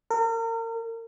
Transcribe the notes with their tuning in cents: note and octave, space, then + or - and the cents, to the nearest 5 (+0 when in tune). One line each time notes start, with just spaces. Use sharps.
A#4 -35